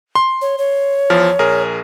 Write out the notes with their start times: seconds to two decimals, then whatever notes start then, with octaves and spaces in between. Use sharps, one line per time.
0.15 C6
0.42 C#5
0.58 C#5
1.10 E2 F3 F6
1.39 A#1 G#4 A#4